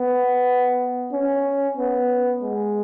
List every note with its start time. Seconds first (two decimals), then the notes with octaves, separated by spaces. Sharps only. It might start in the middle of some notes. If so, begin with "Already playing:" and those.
Already playing: B3
1.13 C#4
1.77 B3
2.42 G#3